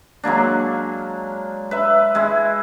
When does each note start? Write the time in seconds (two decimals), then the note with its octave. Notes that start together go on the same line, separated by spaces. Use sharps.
0.24 F#3 G#3 A#3 D4
1.71 B4 E5
2.15 G#3 E4